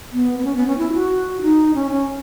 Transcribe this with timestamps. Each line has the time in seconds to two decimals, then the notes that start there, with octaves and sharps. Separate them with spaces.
0.12 B3
0.39 B3
0.45 C#4
0.56 B3
0.67 C#4
0.78 E4
0.93 F#4
1.42 D#4
1.75 C#4
1.91 C#4